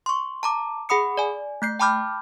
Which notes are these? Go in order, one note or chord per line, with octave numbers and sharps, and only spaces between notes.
C6 C#6
A5 A#5 D6
G#4 F#5 B5 D#6 C#7
D5 G#5
A3 G6 C7
G5 A5 B5 D6 F6 G6